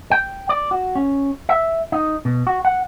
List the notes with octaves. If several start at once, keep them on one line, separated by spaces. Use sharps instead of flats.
G5
D5
F#4
C#4
E5
D#4
B2
F#4
F#5